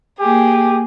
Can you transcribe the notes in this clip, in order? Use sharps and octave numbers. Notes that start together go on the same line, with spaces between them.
A#3 G4 G#4